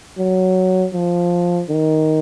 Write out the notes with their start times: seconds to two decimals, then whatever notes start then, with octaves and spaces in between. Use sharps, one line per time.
0.18 F#3
0.94 F3
1.69 D#3